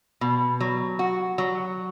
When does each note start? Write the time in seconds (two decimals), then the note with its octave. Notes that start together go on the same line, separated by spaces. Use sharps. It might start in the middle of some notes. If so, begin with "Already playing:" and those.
0.21 B2
0.60 F#3
0.99 F#4
1.38 F#3